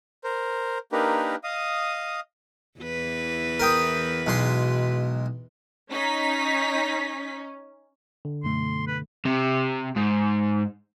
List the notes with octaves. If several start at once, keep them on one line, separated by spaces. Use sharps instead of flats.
A#4 C5
A#3 D4 D#4 G4 A#4 B4
D#5 F5 D#6
E2 E3 B4
A#4 G5 D#6
B1 G#3 C6
C#4 D#4 B6
D3
F#2 B2 A3 C6
B4
C3
G#2